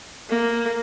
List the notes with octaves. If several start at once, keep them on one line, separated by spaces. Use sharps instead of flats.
A#3